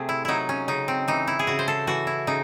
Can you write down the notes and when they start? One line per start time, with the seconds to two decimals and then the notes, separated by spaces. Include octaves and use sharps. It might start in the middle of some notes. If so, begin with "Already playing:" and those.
Already playing: C3 A3 G#4
0.09 E4
0.25 F#3 D#4 E4
0.49 C#4
0.68 C#3 D#4
0.88 C4
1.08 E3 D#4
1.27 E4
1.39 G#4
1.47 C#3 F#4
1.59 C5
1.68 A4
1.87 E3 F#4
2.07 E4
2.27 C#3 D#4